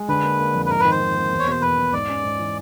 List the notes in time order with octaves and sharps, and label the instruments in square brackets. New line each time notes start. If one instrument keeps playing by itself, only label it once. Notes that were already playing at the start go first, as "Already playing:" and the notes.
Already playing: [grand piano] G#3
[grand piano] D3 [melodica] B4
[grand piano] A#3
A#3
F2
[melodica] B4
[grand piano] G#2 [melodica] A#4
[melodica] B4
[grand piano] D#3
[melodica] C5
[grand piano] D#3
A#3
E2
[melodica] C#5
[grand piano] B2 [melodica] C5
[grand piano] E2 [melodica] B4
[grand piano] E2
[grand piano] G#2 [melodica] D5
[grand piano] C#4
G#2
E3